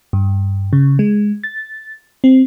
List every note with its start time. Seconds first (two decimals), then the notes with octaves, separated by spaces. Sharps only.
0.13 G2
0.73 C#3
0.99 G#3
1.44 A6
2.24 C4